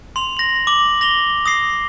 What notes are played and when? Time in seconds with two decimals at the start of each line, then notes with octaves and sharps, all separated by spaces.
0.16 C6 F7
0.37 A#6 F#7
0.67 D6 F#7
1.01 A#6 F7 G7
1.46 D#6 A#6 C7